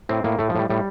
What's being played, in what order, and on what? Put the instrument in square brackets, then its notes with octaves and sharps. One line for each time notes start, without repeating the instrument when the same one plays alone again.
[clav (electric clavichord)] A2 C4
A2 A#3
A2 A3
F3
A2 G3
A2 G3